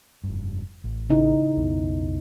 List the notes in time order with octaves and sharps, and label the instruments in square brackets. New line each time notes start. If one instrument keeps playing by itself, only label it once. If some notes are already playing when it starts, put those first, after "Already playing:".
[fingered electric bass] F1 G2
A1
[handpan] C#3 D#4 E4
[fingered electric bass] B1 F2 B3